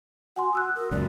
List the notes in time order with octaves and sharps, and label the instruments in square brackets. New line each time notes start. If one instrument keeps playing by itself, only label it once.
[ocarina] F#4 [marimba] F#5 G#5 C6
[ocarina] F#4 [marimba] D#6 E6 F#6
[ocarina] A#4
[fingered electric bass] C#2 F#2 [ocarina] D5